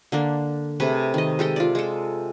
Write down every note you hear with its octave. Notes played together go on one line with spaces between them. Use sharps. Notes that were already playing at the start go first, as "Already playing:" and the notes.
D3 A#3 D4
C3 A3 G#4 B4
D#3 D#5
G#3 G4 A4 D#5
F4 D5
G#3 A4